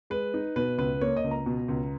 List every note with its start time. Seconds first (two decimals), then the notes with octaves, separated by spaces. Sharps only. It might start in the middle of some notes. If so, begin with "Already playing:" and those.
0.10 G#3 B4
0.34 D#4
0.56 B2 B4
0.78 C#2 B4
1.01 A#3 C#5
1.17 D#5
1.24 C#2
1.31 A#5
1.46 B2
1.68 C#2